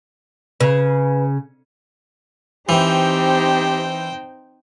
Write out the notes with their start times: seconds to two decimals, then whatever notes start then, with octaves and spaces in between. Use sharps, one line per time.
0.60 C#3 B4
2.69 E3 C4 D#4 G4 C5 G5